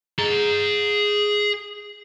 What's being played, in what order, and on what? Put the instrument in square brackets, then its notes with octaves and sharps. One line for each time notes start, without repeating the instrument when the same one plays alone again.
[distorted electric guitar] G#4 A#5